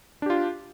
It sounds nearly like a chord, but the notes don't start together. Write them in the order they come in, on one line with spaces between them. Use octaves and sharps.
D4 G4 F4